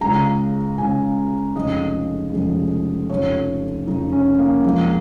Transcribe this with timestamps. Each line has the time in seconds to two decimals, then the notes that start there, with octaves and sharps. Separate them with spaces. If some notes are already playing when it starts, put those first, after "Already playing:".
0.01 C#2 C#3 G#3 A#5
0.78 C#2 C#3 G#3 G#5
1.55 F1 F2 C#3 G#3 D#5
2.33 F1 F2 C#3 G#3
3.10 F1 F2 C#3 C#5
3.87 F1 F2 C#3 D#4
4.12 C#4
4.39 A#3
4.64 F2 F3 G#3